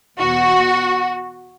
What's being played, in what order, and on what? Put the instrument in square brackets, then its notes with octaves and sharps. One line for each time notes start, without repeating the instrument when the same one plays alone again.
[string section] E2 B2 F#4